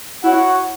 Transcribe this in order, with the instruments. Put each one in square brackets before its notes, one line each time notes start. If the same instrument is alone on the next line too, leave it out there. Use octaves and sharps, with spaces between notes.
[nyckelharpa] E4 [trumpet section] F#4 C#5 F#5